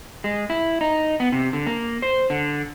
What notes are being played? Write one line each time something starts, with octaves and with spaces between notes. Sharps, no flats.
G#3
E4
D#4
B3
C3
D3
A#3
C5
D3